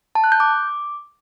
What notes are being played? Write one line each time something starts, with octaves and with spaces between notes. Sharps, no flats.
A5
F#6
G6
D6